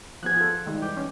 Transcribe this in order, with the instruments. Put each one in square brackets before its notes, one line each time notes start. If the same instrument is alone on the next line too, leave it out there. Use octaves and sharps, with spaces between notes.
[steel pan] F3 B3 G#4 [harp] F#6 G#6
[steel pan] F4 A4
D#3 G3 G#3
[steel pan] E3 [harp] G4
[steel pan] C#4